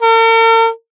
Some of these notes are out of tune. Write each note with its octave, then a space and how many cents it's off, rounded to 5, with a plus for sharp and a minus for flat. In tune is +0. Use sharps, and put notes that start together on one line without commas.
A#4 -45